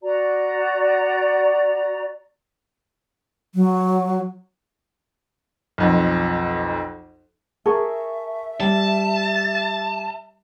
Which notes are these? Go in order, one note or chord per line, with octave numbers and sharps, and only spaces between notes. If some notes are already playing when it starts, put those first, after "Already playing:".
F#4 D5 A#5
F#3
B1 F2
G#4 A#4 E5 A5 C#6
G3 A5